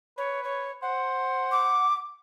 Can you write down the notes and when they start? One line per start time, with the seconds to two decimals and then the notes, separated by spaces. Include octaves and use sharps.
0.18 B4 C#5
0.44 C#5
0.82 C5 F#5
1.52 D6